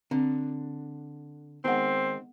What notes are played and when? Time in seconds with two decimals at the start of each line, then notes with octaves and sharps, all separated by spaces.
0.11 D3 C4
1.65 D#3 G#3 B3 C4 F#5